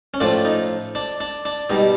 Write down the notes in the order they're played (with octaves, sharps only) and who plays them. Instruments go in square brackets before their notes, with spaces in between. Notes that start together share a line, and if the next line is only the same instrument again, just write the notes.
[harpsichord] C#4
A2 F3 D4
D#4
D4
D4
D4
B2 G3 D#4